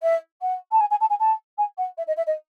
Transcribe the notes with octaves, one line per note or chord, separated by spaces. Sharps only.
E5
F#5
A5
G#5
G#5
A5
G#5
A5
G#5
F#5
E5
D#5
E5
D#5